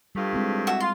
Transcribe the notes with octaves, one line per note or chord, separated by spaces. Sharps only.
G2 G3 A3 F4
G#3 C4 E4
F#4 E5
F4 C6